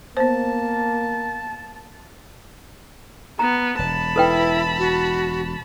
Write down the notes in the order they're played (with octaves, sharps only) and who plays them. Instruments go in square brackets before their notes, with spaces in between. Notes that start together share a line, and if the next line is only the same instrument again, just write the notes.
[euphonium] A#3 [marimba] B3 C5 [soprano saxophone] A5
[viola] B3 [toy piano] A#5
[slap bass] E1 [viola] A5 B5
[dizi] E4 [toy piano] A4 B4 G5
[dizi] F#4